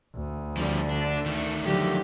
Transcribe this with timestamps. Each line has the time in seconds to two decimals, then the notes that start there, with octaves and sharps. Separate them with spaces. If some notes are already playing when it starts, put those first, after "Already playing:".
0.15 D2
0.57 D3 F3 G3
0.91 D4
1.26 D#3 A3
1.64 D3 F3 F#3 G4